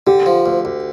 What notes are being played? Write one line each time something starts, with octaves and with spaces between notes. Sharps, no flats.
D3 G4
F3
D2
D2